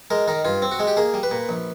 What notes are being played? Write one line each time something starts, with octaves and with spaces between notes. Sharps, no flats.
G#3 A#4
D#3 A#4
G2 F4
C4
F#4
G#3
G4
A#3 G#4
G3
B4
A#2
A#1